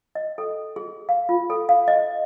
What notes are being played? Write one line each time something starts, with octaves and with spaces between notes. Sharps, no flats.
D#5
A4
G#4
F5
F4
A4
F5
D#5